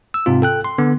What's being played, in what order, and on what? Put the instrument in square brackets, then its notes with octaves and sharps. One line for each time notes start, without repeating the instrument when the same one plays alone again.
[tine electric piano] E6
G#2 C3 C4 F4
A4 G5 F#6
C6
D3 B3